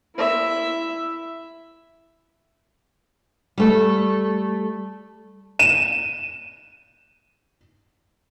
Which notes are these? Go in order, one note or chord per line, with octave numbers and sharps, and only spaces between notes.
E4 E5
G3 A3
D#7 E7